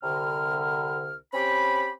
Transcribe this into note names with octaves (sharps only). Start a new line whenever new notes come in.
C2 D3 F6
C4 C#4 G4 B5